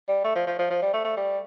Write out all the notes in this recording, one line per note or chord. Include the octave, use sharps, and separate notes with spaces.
G3
A3
F3
F3
F3
F3
G3
A3
A3
G3